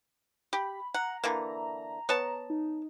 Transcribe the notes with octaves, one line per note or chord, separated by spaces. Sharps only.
G4 B5
F#5 A#5
D3 E3 A#3
B3 C#5 A5
D#4